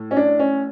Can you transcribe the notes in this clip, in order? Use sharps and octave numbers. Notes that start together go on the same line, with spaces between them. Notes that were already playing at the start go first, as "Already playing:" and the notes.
Already playing: A2
C#4
D4
C#4